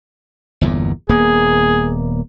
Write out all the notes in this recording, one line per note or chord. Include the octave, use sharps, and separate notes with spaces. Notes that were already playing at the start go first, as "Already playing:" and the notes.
G1 E2 A#2
D#1 A#3 B3 G#4